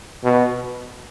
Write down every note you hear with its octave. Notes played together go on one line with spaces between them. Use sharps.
B2